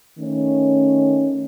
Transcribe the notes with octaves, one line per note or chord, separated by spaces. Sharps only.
D#3 A3 C#4